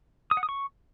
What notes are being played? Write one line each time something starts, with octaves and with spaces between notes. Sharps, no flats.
D#6
F#5
D#6
C#6